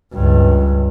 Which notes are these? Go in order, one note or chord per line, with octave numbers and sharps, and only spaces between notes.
C#2 G2